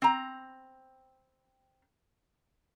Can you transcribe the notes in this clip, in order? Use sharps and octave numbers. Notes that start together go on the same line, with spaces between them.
C4 A#5